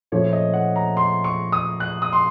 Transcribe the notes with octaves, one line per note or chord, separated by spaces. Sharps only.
A#2 F3 A3 C#4 C#5
D#5
F#5
A#5
C6
C#6
D#6
F#6
D#6
C6